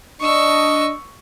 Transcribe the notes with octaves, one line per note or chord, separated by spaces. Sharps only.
D4 D#5 C#6 E6